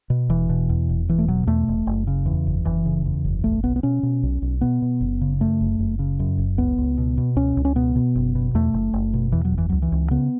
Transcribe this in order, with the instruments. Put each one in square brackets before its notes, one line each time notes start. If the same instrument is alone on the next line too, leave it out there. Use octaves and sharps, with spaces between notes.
[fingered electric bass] B2
E1 E3
B2
E2
E1
E1 E3
A3
B2 F#3
E2 A3
E1
F#1
C#3
E2
F#1
F#1 E3
C#3
E2
F#1
B1 A3
B1 B3
B3
B2 C#4
B2
B1
B1
B2 B3
B2
F#1
C#3
F#2 A3
F#1
F#1
C#3
F#2
F#1
C#2 B3
C#2
B2
B2
C#2 C#4
C#2
C#4
B2 B3
B2
F#1
B2
E2 A3
F#1
F#1
B2
E2 E3
F#3
F#1
E3
C#2 F#3
E3
C#2
C#3 B3